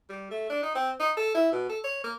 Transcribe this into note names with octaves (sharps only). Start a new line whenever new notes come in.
G3
A3
D4
D#4
C4
D#4
A4
E4
B2
A4
C#5
A#3